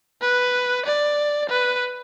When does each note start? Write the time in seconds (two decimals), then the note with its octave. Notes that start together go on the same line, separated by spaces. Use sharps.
0.22 B4
0.86 D5
1.50 B4